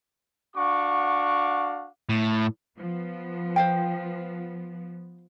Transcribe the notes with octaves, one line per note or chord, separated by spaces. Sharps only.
D4 F#4 F5 F#5 C#6 D6
A2
F3 B3
C5 F5 G5